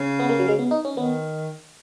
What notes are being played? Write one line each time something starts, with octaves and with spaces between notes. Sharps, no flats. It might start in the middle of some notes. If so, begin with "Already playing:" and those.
Already playing: C#3
B3
A#3
F#3
G#3
B3
D#4
C#4
D#3 B3